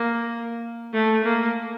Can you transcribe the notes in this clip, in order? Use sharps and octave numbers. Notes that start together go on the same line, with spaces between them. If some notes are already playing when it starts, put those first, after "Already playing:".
Already playing: A#3
A3
A#3